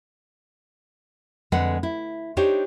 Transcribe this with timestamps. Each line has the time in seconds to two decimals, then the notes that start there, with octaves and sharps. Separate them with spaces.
1.52 F2 D3 G#3 B4 F#5
1.83 E4
2.37 D4 D#4 G4 C5 C#5